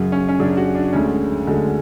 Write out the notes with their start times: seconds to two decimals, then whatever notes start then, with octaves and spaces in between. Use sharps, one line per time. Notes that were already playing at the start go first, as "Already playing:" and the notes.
Already playing: F#2 C#3 F#3
0.12 C#4
0.28 C#4
0.39 F#2 C#3 F#3 D4
0.57 F#4
0.75 D4
0.93 D2 D3 G#3 C#4
1.47 D2 D3 G#3 F#4